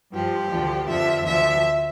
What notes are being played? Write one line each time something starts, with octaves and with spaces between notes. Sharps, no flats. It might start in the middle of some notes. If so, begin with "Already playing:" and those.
G2 F3 G4
D2 D3 F3
F2 D3 F3 E5
D2 D3 F3 E5